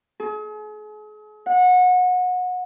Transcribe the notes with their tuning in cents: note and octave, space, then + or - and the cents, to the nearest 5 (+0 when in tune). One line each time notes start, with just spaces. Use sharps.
G#4 +40
F#5 -25